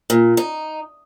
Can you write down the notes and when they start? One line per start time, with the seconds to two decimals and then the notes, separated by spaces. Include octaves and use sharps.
0.10 A#2
0.37 D#4